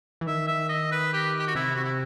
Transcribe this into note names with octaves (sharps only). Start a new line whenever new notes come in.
E3
D#3 E5
E5
D#5
B4
G4
G4
F#4
C3 E4
F#4
E4